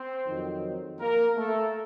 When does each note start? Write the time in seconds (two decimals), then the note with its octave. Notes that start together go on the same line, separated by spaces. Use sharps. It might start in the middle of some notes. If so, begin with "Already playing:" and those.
Already playing: C4 C5
0.25 F2 D#3 F#3
0.99 A#3 A#4
1.37 A3 A4